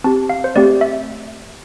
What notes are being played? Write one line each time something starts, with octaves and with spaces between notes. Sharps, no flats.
C4 G4 A5
F5
C5
A3 C4 G4 D5
E5